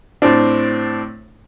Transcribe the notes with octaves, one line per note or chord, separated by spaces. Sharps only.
A2 C4 D4